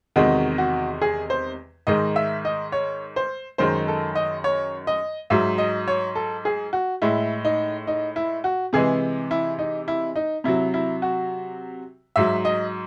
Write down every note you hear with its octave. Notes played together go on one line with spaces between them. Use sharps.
E2 C3 D#3 G#3 F#4
F#4
G#4
C5
G#2 D#3 G#3 D#5
E5
D#5
C#5
C5
F#2 D#3 G#3 C5
A4
D#5
C#5
D#5
G#2 F#3 E5
D#5
C#5
A4
G#4
F#4
A2 G#3 E4
D#4
D#4
E4
F#4
C3 E3 G#3 G#4
E4
D#4
E4
D#4
C3 F#3 E4
E4
F#4
G#2 F#3 E5
D#5